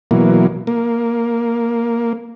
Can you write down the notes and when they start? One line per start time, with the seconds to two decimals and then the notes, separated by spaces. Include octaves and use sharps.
0.11 B2 E3 F#3 A#3
0.67 A#3